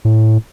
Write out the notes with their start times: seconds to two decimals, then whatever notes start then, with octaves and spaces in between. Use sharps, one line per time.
0.05 A2